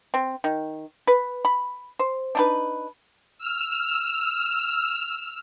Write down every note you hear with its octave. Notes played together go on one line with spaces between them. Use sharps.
C4
D#3
B4
B5
C5
D4 D#4 B4
E6 F6